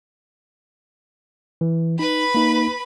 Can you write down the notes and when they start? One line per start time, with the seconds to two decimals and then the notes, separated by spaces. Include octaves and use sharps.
1.61 E3
1.99 D#4 B4 B5
2.35 A#3 D#4